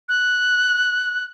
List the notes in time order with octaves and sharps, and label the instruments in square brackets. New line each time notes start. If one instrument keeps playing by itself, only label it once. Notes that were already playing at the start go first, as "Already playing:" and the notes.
[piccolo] F#6